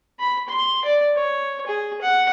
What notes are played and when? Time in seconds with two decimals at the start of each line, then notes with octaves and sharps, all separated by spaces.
0.19 B5
0.48 C6
0.85 D5
1.15 C#5
1.66 G#4
2.01 F#5